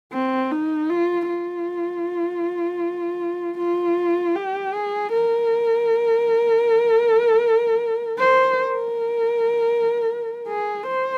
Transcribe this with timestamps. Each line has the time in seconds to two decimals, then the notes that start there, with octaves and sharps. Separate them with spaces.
0.13 C4
0.52 D#4
0.90 F4
1.29 F4
3.58 F4
4.36 G4
4.74 G#4
5.12 A#4
8.19 C5
8.56 A#4
10.48 G#4
10.87 C5